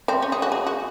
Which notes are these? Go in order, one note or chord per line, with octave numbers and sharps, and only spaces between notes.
C4
C#4
G#4
F#4
G#4
F#4